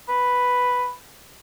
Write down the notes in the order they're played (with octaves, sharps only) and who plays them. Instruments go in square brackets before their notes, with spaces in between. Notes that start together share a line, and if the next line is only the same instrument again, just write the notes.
[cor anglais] B4